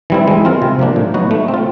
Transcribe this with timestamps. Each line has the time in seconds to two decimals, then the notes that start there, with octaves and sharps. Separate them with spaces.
0.10 E3 G3 C4 E4
0.28 G#3
0.45 C4 F4 A#4
0.62 C3
0.79 F3 A#3 D4
0.96 A2
1.14 F#3 B3 D#4 F#4
1.31 A3
1.48 C4
1.54 F4